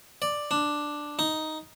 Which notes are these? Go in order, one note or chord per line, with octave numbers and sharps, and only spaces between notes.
D5
D4
D#4